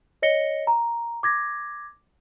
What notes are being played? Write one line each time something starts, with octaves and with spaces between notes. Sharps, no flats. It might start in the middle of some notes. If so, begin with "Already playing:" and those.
C#5 D#5 A#6 C#7 G7
A#5
D6 G#6 A#6